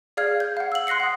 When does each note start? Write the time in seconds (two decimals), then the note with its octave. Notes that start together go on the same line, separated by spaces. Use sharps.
0.17 G#4 D5 F5 F6 G#6
0.40 G6
0.57 F5 F#5
0.72 E6 F#7
0.87 C6 F#6 A#6 C7 C#7
1.00 F#5 D#6